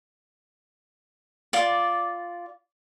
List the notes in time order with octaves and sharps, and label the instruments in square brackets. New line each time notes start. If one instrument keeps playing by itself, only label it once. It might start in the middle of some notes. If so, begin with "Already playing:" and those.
[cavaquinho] F4 D5